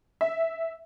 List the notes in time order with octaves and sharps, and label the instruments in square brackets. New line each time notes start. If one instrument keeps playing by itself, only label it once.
[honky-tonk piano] E5